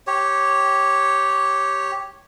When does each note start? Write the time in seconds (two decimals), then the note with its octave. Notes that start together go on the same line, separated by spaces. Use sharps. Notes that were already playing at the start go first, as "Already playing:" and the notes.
0.07 G4 C#5